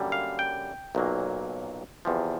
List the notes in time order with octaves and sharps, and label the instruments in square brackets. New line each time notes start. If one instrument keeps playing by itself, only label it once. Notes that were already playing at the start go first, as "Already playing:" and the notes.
Already playing: [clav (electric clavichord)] F#2 D3 G3 A#3
F5
G5
B1 A#2 F#3 A#3
E2 C3 F3